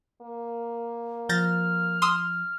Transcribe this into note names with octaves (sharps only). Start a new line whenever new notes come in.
A#3
F3 F6 G6 A6 A#6
C6 D#6 E6